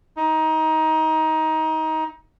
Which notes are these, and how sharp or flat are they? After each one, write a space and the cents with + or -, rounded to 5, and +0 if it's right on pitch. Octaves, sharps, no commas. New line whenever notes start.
D#4 +20